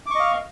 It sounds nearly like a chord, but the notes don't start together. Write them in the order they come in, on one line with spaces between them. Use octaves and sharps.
D6 C#6 D#5 F5